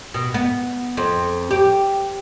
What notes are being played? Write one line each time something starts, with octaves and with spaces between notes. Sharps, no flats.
B2
B3
F2
G4